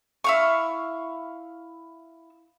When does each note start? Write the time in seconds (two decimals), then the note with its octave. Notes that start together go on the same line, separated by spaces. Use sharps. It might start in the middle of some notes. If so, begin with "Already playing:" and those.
0.24 E4 F5 C#6